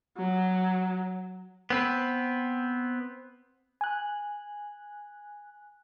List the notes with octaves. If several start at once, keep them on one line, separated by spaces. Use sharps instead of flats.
F#3
B3 C4 B4
G#5 F#6